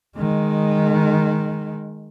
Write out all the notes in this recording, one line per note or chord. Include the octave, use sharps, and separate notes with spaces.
D#3 G#3